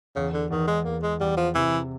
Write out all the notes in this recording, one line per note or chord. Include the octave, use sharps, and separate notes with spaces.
E2 C#3
D3
E2 D#3
G#3
E2 A#3
G#3
E2 G3
F3
C3 E3